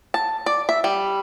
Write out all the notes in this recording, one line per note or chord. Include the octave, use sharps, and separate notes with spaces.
A5
D5
E5
G3